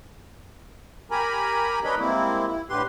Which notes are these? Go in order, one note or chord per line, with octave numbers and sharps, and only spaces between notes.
G4 A#4 G#5 A#5 B5
D4 A#4 B4 C#5 D#5 B5
G3 G#3 A#3 C4 E4
E4
A2 D3 G4 B4 C6